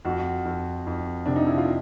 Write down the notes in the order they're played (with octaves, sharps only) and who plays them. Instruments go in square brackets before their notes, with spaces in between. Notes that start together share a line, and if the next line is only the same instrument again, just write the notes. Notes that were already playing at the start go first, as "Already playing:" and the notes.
[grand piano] F2 [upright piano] F#4
[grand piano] F2
F2
[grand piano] C3 [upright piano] D4
[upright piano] D#4
E4
F4